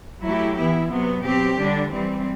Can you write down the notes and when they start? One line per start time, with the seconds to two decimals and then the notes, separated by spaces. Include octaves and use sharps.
0.25 F#3 A3 E4 G4
0.58 E3 B3 E4
0.91 C3 F#3 B3
1.25 B2 F#3 C4 G4
1.59 D3 G3 D4
1.92 E3 G3 C4